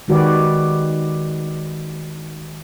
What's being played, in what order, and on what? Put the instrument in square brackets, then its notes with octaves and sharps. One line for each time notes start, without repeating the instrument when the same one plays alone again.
[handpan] D#3 G#3 F#4 G4 B4 D5